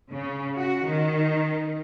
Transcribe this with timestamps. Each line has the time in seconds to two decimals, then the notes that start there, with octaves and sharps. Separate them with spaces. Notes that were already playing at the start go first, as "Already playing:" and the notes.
0.12 C#3
0.58 F#4
0.87 D#3